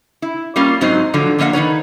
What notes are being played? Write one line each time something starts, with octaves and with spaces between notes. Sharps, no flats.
E4
G3 A#3 C#4 F4
G#2 F#3 C4 D#4 C5
G#2 D3 F3 F#3
D3 F3 A#3 E5 F#5
D#3 D#4 B4 C#5